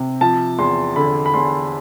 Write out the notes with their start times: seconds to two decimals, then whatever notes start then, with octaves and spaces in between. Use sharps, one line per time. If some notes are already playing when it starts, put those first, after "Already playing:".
Already playing: C3
0.21 F3 A5
0.59 E2 C6
0.96 D3 B5
1.26 B5
1.34 E2 C6